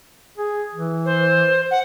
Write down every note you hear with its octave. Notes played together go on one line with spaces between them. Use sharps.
G#4
E3
C5
F#5